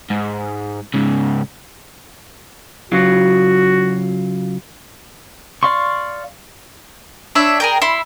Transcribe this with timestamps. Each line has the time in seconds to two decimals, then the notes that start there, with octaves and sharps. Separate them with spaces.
0.10 G#2
0.94 G#2 C#3
2.92 C#3 F#3 F4 F#4
5.63 D5 F5 C6 C#6
7.35 D4 C#5 E5
7.60 G#4 A#4 G5
7.82 E4 C6